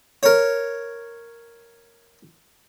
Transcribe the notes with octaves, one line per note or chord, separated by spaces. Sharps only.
A#4 C#5